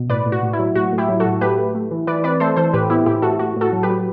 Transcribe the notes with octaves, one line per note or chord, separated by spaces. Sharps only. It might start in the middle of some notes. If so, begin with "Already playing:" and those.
Already playing: B2
A2 B4 D5
A2
F#4
A2
E4
F#3
A2 F#4
A2
E4 G4
F#3
F#4 A4
A2
A3 G4 B4
A3
A3
E3
E3 B4 D5
C4 B4 D5
A3 A4 C5
E3 A4 C5
A2 G4 B4
B3 E4 G4
A2 E4 G4
A2 F#4 A4
A2 F#4
A2 F#4 A4
F#3
G4 B4
F#3